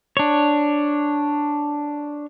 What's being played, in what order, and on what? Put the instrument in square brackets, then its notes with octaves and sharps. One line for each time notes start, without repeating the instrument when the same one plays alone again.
[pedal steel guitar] D4 C#5